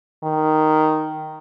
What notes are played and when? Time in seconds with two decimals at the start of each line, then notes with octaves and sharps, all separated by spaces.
0.23 D#3